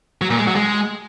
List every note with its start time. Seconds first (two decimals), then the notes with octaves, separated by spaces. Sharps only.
0.21 F#3
0.30 A#2
0.39 G#3
0.47 F#3
0.56 G#3